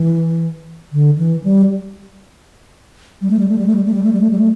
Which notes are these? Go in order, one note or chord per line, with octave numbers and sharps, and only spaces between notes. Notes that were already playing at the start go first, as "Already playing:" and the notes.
Already playing: E3
D3
E3
G3
G3
A3
G3
A3
G3
A3
G3
A3
G3
A3
G3
A3
G3
A3